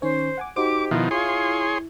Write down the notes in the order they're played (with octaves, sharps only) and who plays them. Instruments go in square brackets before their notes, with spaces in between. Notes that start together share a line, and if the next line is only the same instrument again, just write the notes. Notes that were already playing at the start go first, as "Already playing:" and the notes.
[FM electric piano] D#3 C#4 C#5 [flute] C5
[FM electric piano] F#5 G#5 D6
[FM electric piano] D#4 F#4 C5 [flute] G4 [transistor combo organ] D6
[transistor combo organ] B2 D#3 F3 [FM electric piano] E4
[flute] F4 [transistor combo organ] G#4 C#5 C6